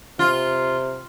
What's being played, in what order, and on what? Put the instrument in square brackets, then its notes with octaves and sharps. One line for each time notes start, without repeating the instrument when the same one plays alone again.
[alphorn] C3 [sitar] F4